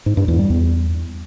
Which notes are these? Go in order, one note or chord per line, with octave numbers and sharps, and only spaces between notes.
G#2
G2
E2
G3
E2